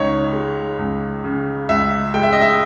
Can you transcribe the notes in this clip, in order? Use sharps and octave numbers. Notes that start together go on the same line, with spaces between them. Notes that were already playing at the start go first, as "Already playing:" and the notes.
Already playing: C#2 C#3 D#4 C#5
G#3
C#2
C#3
C#2 E5
G#3 G5
E5
D#5
E5